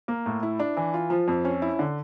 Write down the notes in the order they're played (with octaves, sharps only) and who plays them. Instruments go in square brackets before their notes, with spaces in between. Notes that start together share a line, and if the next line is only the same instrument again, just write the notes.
[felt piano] A#3
A2
E4
D4
E3
F4
F3
F2
C#4
E4
D3